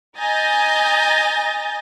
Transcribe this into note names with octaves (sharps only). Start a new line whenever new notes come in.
D#5 G#5 A#5 G6 A6 A#6